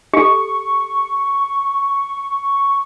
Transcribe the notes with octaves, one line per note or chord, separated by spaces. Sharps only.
G4 A4 C#6